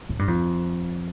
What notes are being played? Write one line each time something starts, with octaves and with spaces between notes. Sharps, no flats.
A2
G2
F2